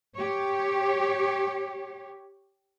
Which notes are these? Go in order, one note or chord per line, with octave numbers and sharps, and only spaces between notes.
G4 C#5